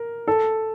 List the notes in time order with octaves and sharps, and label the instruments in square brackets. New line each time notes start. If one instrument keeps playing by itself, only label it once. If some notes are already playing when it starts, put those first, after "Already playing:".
Already playing: [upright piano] A#4
A4